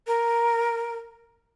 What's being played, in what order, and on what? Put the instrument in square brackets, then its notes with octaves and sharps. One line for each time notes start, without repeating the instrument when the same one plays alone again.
[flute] A#4